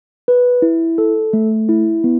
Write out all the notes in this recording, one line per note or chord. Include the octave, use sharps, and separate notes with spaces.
B4
E4
A4
A3
E4
B3